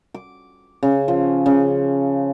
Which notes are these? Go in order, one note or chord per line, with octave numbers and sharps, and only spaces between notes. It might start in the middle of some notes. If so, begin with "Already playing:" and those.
D6
C#3
F3
C#3